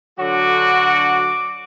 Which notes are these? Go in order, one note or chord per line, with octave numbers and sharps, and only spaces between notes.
D3 F#3 F#4 D6